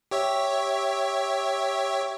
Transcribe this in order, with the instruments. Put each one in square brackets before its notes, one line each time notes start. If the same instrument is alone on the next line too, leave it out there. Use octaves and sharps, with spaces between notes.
[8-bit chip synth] G4 C#5 E5